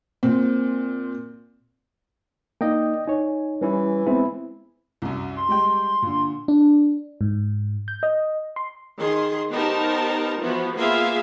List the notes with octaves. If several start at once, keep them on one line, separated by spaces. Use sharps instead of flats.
A#2 C4
A#3 D#4 D5 D#5 G5
D#4 C#5 G#5
E3 G3 C#4 E4
G#3 B3 C4 E4
C2 F#2
C6
G3 G#3 G5
A#2 D3
D4
G#2
G6
D#5
C6
D#3 G#4 C6
B3 D#4 G4 A#4 C5 A5
E3 F3 B3 F#4
A#3 B3 F4 G#4 E5 F5